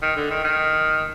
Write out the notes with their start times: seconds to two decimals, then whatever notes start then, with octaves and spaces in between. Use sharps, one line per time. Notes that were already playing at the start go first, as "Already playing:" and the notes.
0.02 D#3
0.16 D3
0.30 D#3
0.44 D#3